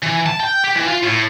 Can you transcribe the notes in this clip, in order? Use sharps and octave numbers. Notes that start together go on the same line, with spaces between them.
E3
A5
G5
G4
E3
F4
A2